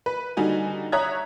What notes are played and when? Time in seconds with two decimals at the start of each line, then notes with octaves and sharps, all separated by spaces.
0.06 B4
0.37 D3 G3 D#4 F#4 G#5
0.92 C#5 E5 A#5 D#6 F#6 G#6